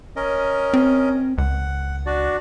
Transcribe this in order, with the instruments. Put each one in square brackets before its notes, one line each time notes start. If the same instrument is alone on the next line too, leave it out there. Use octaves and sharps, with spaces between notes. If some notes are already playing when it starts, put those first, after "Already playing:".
[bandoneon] C#4 A#4 D#5
[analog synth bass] C4
[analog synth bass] C#2 [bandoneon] F#5
[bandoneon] D4 F#4 D5